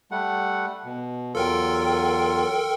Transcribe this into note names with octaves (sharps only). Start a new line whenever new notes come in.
G3 A3 F#5
B2
E2 F#3 F4 A4 A#4 G5